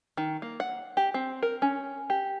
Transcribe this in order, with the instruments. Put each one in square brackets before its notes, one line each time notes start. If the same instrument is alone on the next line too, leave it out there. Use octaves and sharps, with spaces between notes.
[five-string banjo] D#3
A#3
F#5
G4
C4
A#4
C#4
G4